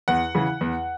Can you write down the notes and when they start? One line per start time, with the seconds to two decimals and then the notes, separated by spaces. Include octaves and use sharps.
0.08 E2 F#5
0.35 C#3 E3
0.61 E2